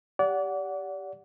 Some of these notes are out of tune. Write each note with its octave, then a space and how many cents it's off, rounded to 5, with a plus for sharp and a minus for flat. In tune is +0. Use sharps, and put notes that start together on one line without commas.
G4 +0 D5 -30 F#5 -5